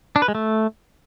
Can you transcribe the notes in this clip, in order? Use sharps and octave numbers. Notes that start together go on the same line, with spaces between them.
D4
B4
G#3
A3